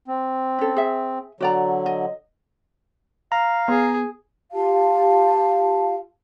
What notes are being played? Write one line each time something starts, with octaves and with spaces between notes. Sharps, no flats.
C4
C#4 A4
G#4 E5
D3 F#3 F#4 D5 A#5
D#5
F5 A#5
B3 G#4
F4 G4 F5 A5